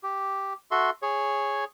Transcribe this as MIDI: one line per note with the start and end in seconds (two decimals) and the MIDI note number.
0.03 0.53 67
0.71 0.90 66
0.71 0.90 69
0.71 0.90 76
0.71 0.90 84
1.02 1.64 68
1.02 1.64 73